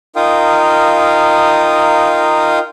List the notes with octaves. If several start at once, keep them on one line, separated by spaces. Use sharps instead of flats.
D#4 F4 A#4 F5 G5 D#6